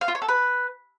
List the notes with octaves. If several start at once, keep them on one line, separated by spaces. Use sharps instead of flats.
F5
F4
C#5
A4
B4